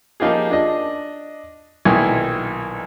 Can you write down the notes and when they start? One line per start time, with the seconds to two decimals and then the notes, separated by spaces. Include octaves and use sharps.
0.20 F3 A#3 D#4 F4 G4 G#4
0.51 D4 D#5
1.85 B1 A#2 D#3 E4 G#5